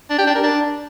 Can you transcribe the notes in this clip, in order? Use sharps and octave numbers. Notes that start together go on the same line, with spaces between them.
D4
G4
D4
A#4
D4